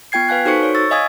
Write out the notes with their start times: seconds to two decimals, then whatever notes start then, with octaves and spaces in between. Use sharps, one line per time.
0.12 B3 F4 G5 G#6 C7
0.29 B4 F5 G#5 F#6
0.45 D#4 F#4 A4 C5 C#6 C#7
0.63 C#5
0.75 C#6 E6 A6
0.91 D#5 F5 G#5 D#6 G#6